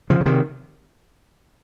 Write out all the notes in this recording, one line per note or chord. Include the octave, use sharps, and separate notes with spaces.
C#3 F3
C#3
C3 D#3